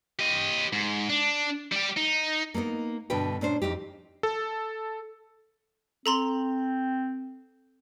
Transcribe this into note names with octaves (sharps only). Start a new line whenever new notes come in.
G4 D#5
G#2
D4
G3 G4
D#4
A#3 B3 D#4 A#4
G2 B2 D3 B4 G5
A#2 C#4 D4 C5
F2 E3 D#4 G4
A4
C4 A4 A#5 C6